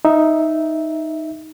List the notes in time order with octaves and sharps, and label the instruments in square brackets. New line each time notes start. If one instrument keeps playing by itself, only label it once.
[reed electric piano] D#4 E5